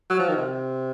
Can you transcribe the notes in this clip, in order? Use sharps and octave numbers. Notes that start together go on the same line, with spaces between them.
F#3
F3
D#3
C3